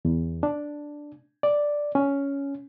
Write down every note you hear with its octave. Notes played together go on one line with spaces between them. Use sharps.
E2
D4
D5
C#4